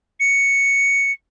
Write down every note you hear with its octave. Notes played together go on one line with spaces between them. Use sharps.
C#7